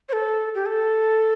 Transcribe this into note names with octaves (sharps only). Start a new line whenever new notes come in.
C#5
A4
G4
A4